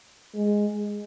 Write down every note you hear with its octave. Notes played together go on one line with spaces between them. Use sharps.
G#3